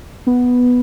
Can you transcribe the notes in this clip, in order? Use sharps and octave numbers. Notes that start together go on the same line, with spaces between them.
B3